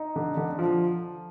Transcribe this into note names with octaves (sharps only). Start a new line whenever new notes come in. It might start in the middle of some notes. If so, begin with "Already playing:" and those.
Already playing: D#4
D3
D3
F3